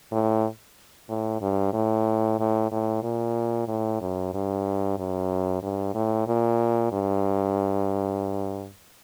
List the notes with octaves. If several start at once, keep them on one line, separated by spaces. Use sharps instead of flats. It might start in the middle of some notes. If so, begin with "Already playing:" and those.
A2
A2
G2
A2
A2
A2
A#2
A2
F#2
G2
F#2
G2
A2
A#2
G2